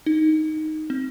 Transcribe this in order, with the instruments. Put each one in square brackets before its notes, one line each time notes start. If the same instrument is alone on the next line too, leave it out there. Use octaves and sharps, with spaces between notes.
[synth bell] D#4
C4